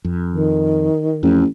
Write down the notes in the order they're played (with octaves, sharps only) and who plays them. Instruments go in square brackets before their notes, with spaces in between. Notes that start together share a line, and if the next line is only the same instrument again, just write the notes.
[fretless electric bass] F2
[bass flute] D#3
[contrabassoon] A1 [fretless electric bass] F2